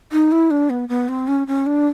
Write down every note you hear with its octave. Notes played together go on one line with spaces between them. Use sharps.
D#4
E4
D4
B3
B3
C4
C#4
C#4
D4